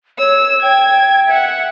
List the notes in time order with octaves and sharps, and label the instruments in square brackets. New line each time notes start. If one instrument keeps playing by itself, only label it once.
[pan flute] C#5 [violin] E6
[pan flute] G5 [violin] G#6
[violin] E5 F#5